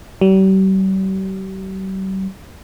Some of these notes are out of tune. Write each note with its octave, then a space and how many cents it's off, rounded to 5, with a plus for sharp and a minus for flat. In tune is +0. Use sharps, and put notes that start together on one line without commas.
G3 -45